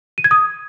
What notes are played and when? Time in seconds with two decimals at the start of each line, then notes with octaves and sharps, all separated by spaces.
0.18 D#7
0.24 G#6
0.31 D#6